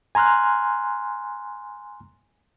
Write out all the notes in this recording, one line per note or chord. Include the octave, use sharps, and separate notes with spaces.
G#5 A#5 C6 F6 F#6